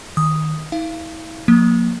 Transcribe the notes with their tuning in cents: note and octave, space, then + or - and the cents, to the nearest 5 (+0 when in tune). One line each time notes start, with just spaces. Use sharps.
D#3 +0 D#6 +0
E4 -40 F5 -30
F3 +40 A#3 +0